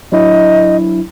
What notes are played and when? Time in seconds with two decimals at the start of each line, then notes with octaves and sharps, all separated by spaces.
0.12 F#3 D4 E4 D#5